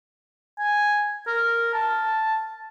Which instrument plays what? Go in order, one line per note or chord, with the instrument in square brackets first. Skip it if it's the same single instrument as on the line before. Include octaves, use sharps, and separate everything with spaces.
[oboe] G#5
A#4
A5